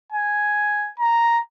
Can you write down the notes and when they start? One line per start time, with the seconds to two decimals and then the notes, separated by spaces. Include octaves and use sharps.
0.13 G#5
1.00 A#5